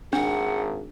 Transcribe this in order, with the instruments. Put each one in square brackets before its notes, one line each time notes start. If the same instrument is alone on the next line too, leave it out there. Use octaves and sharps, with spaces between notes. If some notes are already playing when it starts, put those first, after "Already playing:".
[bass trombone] G#1 [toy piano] D4 [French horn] G#4 [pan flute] F#5